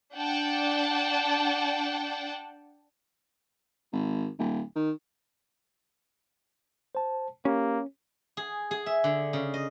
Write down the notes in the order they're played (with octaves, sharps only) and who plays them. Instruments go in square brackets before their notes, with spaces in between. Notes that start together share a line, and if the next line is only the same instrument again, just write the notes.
[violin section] D4 F#5 G5 A5
[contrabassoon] G#1
D#1
D#3
[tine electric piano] C5 A5
[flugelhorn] A#3 [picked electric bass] C#4 [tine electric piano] G4
[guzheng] G#4
G#4
E5
D3
C#3
D#5